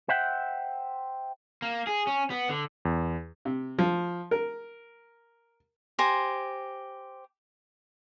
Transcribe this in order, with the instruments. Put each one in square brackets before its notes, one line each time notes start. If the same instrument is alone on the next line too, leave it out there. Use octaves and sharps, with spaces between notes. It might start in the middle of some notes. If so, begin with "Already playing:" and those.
[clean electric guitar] C5 E5 F#5 G5
[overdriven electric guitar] A#3
G#4
C#4
B3
D3
[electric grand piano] E2
[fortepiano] C3
F3
A#4
[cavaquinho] G4 C5 G#5 A#5